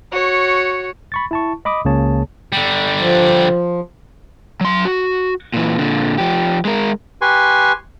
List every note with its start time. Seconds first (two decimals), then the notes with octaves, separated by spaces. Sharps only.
0.12 F#4 C#5
1.12 B5 C#6 A6
1.31 E4 A5 C#6
1.65 D#5 B5 D6 D#6
1.85 C#2 C#3 A#3 G#4 C#5 A5
2.53 D3 G3
3.00 F3
4.61 F#3 C6
4.85 F#4
5.54 A#2 E3
5.79 A#2 D3
6.18 F3 G4
6.65 G#3 A#4
7.21 G4 B4 G#5 C6 C#6